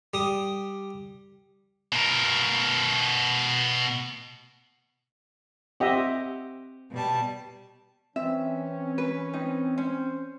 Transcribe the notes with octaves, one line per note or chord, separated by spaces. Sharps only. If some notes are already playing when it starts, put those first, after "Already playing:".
G3 D#6
B2 A#4
C4 G4 D#5 E5 F#5
B2 G3 A5
E3 C4 C#4 E5
B4
C4 D#4
C#4 C5